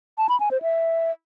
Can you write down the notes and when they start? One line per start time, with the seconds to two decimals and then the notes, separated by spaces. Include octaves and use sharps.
0.18 A5
0.29 B5
0.40 G#5
0.51 C5
0.62 E5